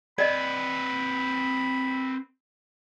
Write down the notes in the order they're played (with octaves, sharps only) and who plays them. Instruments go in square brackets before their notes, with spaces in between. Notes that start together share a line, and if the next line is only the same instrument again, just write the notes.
[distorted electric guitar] C4 B4 [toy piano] D5 D#5 [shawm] B5